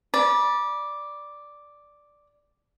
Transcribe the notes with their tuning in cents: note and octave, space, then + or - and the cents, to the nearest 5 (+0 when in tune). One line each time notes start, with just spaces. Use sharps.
D5 +0 B5 -30